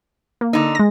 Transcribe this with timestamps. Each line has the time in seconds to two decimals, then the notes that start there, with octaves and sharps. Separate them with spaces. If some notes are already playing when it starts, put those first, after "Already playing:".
0.41 A#3
0.53 D3 D#4
0.75 G#3 A#6